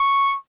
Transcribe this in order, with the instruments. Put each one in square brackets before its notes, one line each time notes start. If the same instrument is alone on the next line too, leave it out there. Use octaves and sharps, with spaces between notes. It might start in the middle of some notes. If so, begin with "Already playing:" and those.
Already playing: [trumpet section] C#6